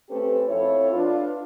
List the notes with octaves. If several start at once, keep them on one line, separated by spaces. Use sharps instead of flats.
A3 C4 C#4 G4 A4 B4
F2 E4 A4 C#5
D4 F4 B4